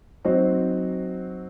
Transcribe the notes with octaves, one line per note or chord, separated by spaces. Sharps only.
F#3 C4 D#4 F#4 C5